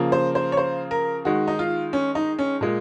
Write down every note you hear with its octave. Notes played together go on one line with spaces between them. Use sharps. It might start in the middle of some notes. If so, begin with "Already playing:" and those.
Already playing: C#3 F3 A#3
C5
C5
C#5
C5
A#4
D#3 G#3 F#4
D#4
F4
C#4
D#4
C#4
A#2 G#3